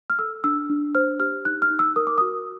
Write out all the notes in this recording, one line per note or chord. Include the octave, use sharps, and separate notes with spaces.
F6
A4 E6
D4 E6
D4
C5 F6
G4 F6
D#4 F#6
F6
D#4
E6
A#4 D#6
D6
F#4 D#6